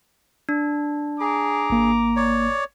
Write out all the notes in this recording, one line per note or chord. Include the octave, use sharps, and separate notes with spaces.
D4
G#4 A#5 D6
G#1 A#3
C#5 D5